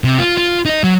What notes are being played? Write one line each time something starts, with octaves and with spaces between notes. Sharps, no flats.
C3
F4
F4
D#4 D#5
F#3